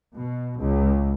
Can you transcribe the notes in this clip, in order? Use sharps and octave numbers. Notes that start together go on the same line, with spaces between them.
B2
C#2